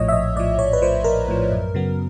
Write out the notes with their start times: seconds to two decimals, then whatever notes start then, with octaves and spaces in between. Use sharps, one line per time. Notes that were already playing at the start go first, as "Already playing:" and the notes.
Already playing: A#1 A2 F3 C#5 D#5
0.08 E5
0.12 A#1 D#5
0.36 A2 F3 D5
0.59 A#1 C#5
0.73 B4
0.82 A2 F3 C5
1.04 A#1 A#4
1.28 A2 F3
1.51 F#2
1.74 C#3 F#3 B3